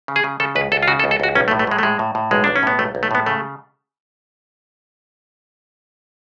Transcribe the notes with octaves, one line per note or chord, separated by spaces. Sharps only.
C#3
G#4
C#3
C#3 A4
C#2 B4
C#2 A4
F4
C#3 F#4
A4
C#2
A4
C#2 F#4
B1 C#4
A3
A2
A3
A2 G#3
A3
A2 G#3
A2
A2
B1 G#3
B1 D4
C#4
A2 B3
B1 A3
B1
A3
A2 B3
C#3 A3